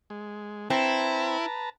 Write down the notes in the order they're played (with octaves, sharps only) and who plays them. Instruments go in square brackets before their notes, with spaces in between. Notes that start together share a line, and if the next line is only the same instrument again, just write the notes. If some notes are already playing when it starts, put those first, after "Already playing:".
[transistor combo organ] G#3
[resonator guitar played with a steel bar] C4 [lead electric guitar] E4 [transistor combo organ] B4 A5 A#5